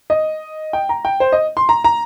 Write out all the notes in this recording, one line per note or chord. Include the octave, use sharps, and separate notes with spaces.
D#5
G5
A#5
G5
C5
D#5
C6
A#5
A#5